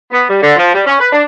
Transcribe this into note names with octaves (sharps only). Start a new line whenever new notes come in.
B3
G3
D3
F3
G3
C#4
B4
D4